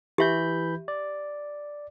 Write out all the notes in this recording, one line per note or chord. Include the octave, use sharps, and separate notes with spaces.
E3 G4 E5 B5 G6
D5